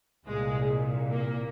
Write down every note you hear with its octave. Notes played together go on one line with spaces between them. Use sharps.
C2 A#2 G#3
A#3